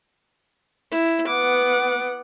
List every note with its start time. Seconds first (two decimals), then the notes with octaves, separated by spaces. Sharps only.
0.91 E4
1.27 B3 F#5 D6